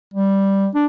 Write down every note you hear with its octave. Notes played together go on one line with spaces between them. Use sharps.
G3
D4